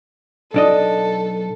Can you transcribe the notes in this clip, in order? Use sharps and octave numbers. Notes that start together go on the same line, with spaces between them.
B1 D4 A4 D#5